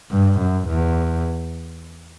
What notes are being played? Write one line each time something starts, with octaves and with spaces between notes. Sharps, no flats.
G2
F#2
E2